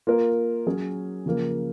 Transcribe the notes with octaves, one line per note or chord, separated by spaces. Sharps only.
A#3 F4 A#4
F#3 C#4 G#4
C#3 F3 A#3